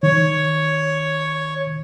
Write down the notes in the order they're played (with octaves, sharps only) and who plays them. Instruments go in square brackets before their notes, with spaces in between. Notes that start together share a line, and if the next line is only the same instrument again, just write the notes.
[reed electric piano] D#3 [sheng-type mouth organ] C#5